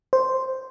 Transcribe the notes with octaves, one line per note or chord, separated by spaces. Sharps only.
C5